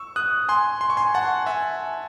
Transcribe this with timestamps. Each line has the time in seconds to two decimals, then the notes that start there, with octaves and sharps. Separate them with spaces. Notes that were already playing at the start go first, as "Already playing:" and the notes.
Already playing: C#6 E6
0.16 D#6 F#6
0.49 G#5 C6
0.81 C6
0.90 C#6
0.97 G#5 C6
1.14 F#5 A5
1.46 E5 G#5